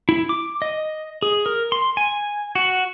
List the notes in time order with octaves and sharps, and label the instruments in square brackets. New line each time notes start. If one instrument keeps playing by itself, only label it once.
[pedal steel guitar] E4
D6
D#5
G#4
A#4
C6
G#5
F#4